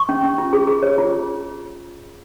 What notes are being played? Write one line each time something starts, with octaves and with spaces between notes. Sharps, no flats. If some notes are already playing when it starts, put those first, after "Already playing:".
Already playing: C#6
C#4
C#4
F4
G#4
G#4
C#5
F4